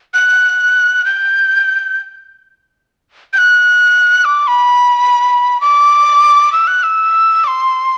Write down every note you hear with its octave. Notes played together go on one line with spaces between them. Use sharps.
F#6
G6
G6
F#6
D6
B5
D6
E6
F#6
E6
D6
C6